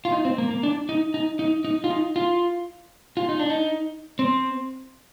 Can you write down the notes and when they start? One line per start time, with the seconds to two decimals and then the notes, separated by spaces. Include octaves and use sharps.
0.05 F4
0.12 D#4
0.25 C4
0.38 A#3
0.51 A#3
0.63 D4
0.89 D#4
1.14 D#4
1.39 D#4
1.65 D#4
1.84 F4
1.90 D#4
2.16 F4
3.17 F4
3.29 D#4
3.39 D4
3.50 D#4
4.19 C4